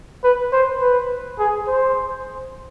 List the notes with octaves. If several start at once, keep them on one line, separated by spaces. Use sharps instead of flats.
B4
C5
B4
G#4
C5